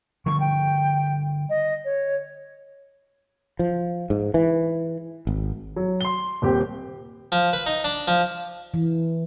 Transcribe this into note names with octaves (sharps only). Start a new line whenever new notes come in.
D3 F3 G3 C#6
G5
D#5
C#5
F3
G#2
E3
G#1
F#3
C6 G7
D#1 C4 G4
F3
B4
D#4
D4
F3
E3